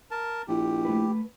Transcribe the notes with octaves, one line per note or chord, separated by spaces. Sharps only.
A#4 A5
A#1 E4 G4
A3 B4